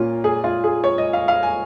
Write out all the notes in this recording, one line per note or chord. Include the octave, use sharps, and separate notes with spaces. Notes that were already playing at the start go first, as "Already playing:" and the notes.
Already playing: A#2 A#3 C#4 F4
G#4
F4
G#4
C#5
D#5
F5
F5
G#5